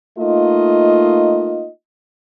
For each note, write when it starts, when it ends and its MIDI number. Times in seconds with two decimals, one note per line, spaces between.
0.18 1.68 57
0.18 1.68 58
0.18 1.68 63
0.18 1.68 65
0.18 1.68 75